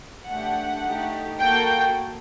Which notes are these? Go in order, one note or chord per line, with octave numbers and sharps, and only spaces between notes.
A3 D4 G4 F#5
A3 D#4 G4
A#3 F#4 A4 G5